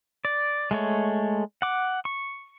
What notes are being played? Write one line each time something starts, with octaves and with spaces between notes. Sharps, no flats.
D5
G#3 A3 C#5
F#5 D6
C#6